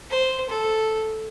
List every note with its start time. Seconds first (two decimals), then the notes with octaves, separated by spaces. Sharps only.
0.10 C5
0.49 A4